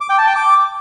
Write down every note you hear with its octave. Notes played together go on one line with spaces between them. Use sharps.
D6
G5
A5
G5
D6